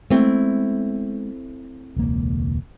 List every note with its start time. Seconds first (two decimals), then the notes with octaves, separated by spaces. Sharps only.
0.10 G#3 A3 B3 C4 E4
1.96 E1 C#2 A#3